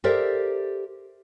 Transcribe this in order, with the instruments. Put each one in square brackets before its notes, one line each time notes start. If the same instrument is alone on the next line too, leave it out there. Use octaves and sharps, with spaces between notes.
[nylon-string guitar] G4 A4 A#4 C5 D5 E5